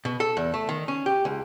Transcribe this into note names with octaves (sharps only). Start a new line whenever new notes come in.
B2
A4
E2
A3
D#3
C#4
G4
C#2